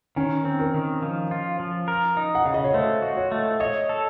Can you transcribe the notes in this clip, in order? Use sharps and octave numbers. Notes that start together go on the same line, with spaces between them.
D#3 C#4
C4
A#4
D#3
F3
F4
F3
A#4
D#4
F#5
C#3 F5
D#5
C#5
A3 C5
F#4
C#5
A3
C#5 D#5
A4